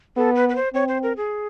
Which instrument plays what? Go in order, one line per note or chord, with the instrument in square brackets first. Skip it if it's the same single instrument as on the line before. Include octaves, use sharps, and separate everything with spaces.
[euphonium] B3 [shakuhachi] A4
[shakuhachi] B4
B4
C5
[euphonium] C4 [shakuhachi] C#5
[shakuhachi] C5
A#4
G#4